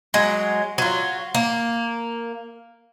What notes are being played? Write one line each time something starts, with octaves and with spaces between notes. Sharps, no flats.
F#3 G#3
F#3 F4
A#3